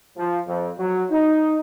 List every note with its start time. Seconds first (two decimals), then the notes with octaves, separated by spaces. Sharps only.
0.17 F3
0.48 F2
0.78 F#3
1.10 D#4